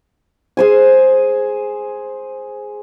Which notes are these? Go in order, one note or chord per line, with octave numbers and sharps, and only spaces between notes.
G#4 C5 G#5